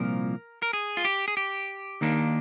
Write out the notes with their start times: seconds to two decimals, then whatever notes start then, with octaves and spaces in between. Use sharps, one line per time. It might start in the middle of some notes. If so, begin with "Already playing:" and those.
Already playing: C2 A#2 F3 A#3 A#4
0.62 A#4
0.73 G#4
0.97 F4
1.05 G4
1.28 G#4
1.37 G4
2.01 D#2 D#3 A#3 D4